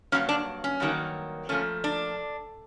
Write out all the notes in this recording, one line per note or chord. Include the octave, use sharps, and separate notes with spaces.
G2 D#3 F#3 A#3 C#4
D4
C#4
G2 D#3 F#3 A#3
A#2 F3 A3 C#4
D4